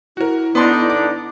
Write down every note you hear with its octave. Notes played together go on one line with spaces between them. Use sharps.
E4 F#4 A#4
D3 B3 D4 D#4 C6
D6